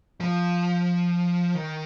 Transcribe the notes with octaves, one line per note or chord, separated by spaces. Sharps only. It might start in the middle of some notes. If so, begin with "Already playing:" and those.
F3
D#3